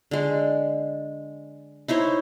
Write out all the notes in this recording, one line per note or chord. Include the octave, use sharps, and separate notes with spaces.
D3 G#3
D#4 E4 C5 C#5